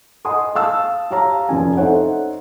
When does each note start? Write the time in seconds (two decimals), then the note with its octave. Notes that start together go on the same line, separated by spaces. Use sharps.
0.25 D#5 F#5 G#5 C6 D#6
0.55 F5 A5 E6
1.10 G4 C#5 F5 A5 A#5
1.49 F1 F3 C#4 G#5
1.77 D#4 A4 C5 C#5 E5 F#5